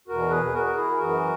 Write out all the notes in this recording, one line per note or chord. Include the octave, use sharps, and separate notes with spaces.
E2 B2 F#4 A#4
G#4 B4
F#4 A#4
A#4
E4 G#4
F#2 E3 F#4 A#4